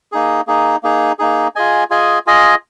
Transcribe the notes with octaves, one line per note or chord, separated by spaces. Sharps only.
A#3 D#4 G#4
A#3 D#4 G#4
A#3 D#4 G#4
A#3 D#4 G#4
F4 G#4 D#5 G#5
F4 G#4 D#5 G#5
F4 G#4 D#5 G#5